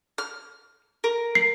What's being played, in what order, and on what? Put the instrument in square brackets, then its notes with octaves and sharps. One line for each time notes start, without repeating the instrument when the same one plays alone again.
[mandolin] F6
A#4
[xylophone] C7